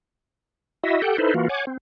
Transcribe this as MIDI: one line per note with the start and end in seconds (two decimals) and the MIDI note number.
0.83 1.02 64
0.83 1.02 66
0.83 1.02 75
0.83 1.02 76
1.02 1.17 67
1.02 1.17 69
1.02 1.17 78
1.02 1.17 79
1.18 1.34 63
1.18 1.34 64
1.18 1.34 69
1.18 1.34 71
1.18 1.34 72
1.34 1.48 52
1.34 1.48 58
1.34 1.48 65
1.34 1.48 66
1.49 1.65 73
1.49 1.65 78
1.49 1.65 80
1.49 1.65 86
1.67 1.77 60